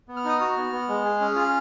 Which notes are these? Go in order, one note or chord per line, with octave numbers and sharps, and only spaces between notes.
B3
F6
D#4 D#6
F#4 F6
B3
B3
G#3
G#4
C#4
F4 F6